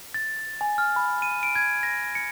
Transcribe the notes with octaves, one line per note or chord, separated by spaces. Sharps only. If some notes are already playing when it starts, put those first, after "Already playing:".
A6
G#5
F6
B5
D#7
D7
G#6
A#6
C#7